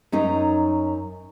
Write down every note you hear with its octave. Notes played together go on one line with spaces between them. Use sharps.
F#2 C#4 D#4